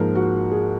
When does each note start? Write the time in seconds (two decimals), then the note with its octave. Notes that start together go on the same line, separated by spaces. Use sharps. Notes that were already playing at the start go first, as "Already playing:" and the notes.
Already playing: G#2 F3 A#3 A#4
0.15 F#4
0.51 G#4